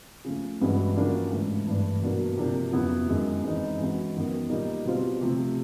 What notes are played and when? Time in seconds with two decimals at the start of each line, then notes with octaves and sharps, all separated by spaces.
0.25 C#3 F3 A3
0.61 G2 E3 G#3 C#4 F#4
0.95 C#3 F3 A#3 D4 F#4
1.31 G#2 E3 A3
1.67 G2 E3 A3 D4
2.02 B2 F#3 A#3 D4 F#4
2.37 C3 F3 A#3 D4
2.73 F2 C#3 F#3 B3 E4
3.08 F#2 D#3 G#3
3.44 E3 G#3 C4 D#4
3.79 E3 G#3 C#4 F#4
4.14 F#2 D#3 F#3 B3
4.49 A#2 G3 A#3 D#4
4.85 B2 G3 C4 F4
5.21 C3 F3 A3